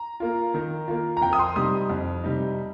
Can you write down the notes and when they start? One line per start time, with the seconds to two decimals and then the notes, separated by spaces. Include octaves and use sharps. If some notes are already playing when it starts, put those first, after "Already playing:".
Already playing: A#5
0.20 A#3 F4
0.54 D#3
0.88 A#3 F4
1.17 A#5
1.22 F2 G5
1.33 D#6
1.39 C6
1.56 C3 G3 D#4 D#6
1.90 F2
2.24 C3 G3 D#4